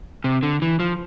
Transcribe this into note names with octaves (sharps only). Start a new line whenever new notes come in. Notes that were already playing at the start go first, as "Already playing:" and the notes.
C3
D3
E3
F3